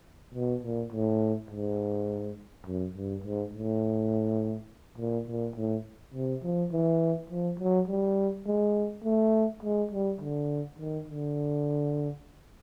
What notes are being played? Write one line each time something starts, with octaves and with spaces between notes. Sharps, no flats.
B2
A#2
A2
G#2
F#2
G2
G#2
A2
A#2
A#2
A2
C3
F3
E3
F3
F#3
G3
G#3
A3
G#3
G3
D3
D#3
D3